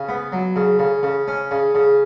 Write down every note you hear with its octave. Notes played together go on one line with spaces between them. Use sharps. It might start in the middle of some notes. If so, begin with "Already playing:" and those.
Already playing: C#3
B3
F#3
C#3
C#3
C#3
C#4
C#3
C#3